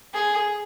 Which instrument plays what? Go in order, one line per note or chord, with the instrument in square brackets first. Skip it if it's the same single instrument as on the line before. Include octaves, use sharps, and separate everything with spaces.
[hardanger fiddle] G#4